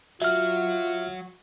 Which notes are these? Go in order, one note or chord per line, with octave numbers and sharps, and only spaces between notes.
F#3 F4 F#4 E5 F6